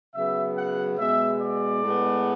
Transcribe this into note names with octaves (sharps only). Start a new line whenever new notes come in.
C#3 F#3 B3 E5
F#5
B2 G#3 B3 E5
D5
A2 G#3 B3